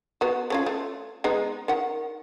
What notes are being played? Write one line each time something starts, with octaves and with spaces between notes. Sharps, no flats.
B3 F#4
A3 C#4 F4
A3
G#3 B3 D#4
D#3 F#5